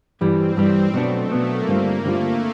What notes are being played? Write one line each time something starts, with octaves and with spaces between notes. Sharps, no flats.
G2 E3 G3 C4
G2 E3 G3
B2 F#3 A3 B3 D4
B2 F#3 A#3 B3 D4
G2 D3 G3 C4 F4
G2 D3 G3 A3 C4 F4